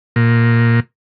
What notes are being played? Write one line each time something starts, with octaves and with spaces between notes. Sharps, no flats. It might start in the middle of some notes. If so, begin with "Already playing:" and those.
A#2